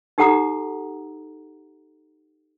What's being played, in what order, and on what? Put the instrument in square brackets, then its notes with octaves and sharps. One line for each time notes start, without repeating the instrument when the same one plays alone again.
[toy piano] D#4 G4 A4 F#5 A#5 D#6